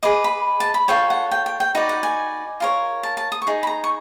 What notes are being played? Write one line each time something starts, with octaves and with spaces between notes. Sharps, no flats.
G#4 B4 D#5 D6
B5
A5
B5
F4 A4 C#5 G5
F#5
G5
G5
G5
D#4 F#4 B4 D5 G5
F#5
G#5
F4 A#4 C#5
A5
A5
D#6
C#6
D#4 G#4
B5
A#5
C#6